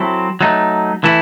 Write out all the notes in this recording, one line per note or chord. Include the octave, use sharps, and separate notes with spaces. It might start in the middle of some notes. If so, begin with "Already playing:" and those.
Already playing: F#3 C4 E4 A4
F#3 A3 D#4
E3 A3 E4